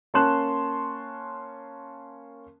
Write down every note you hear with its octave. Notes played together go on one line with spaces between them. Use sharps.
A#3 C#4 A5 C6 F#6 E7